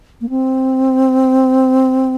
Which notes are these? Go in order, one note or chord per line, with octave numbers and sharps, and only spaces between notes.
A#3
C4